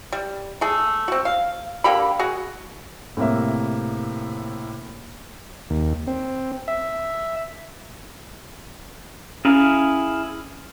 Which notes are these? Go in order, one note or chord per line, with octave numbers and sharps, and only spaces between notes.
G3
A3 G#4
C4 F#4
F5
D3 A#3 G4 B5
F#4 G#4
A2 C3 A#3 E5
D#2
C4
E5
C#4 E4 G#4 F5